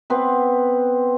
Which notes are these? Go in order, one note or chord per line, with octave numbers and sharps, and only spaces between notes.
B3 C4 B4